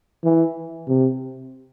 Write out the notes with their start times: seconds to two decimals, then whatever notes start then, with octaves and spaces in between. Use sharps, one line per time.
0.24 E3
0.88 C3